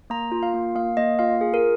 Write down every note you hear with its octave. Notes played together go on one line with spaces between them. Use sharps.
A#3 A#5
F4
F5
A#3
A#3 F5
A#3 D#5
F4 F5
G#4
A#4